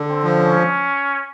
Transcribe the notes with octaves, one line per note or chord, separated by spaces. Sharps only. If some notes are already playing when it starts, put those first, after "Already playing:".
Already playing: D3
C4
F3
C#4